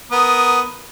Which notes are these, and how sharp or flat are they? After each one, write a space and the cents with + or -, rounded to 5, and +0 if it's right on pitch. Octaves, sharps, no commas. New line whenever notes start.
B3 +0 A#4 +0 D#6 +0